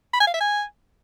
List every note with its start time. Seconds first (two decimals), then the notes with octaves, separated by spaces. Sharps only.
0.13 B5
0.20 G#5
0.27 F5
0.34 E5
0.41 G#5